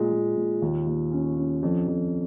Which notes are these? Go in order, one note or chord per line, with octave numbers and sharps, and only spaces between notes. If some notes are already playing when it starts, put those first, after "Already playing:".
Already playing: A#2 G#3
A#2
A#2
D#2
D#2
C#4
C#4
F2
F2